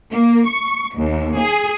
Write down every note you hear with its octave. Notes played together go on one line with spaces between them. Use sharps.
A#3
C#6
D#2
G#4